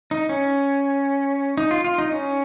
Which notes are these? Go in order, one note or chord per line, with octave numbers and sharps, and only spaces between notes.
D#4
C#4
D#4
F4
F4
D#4
C#4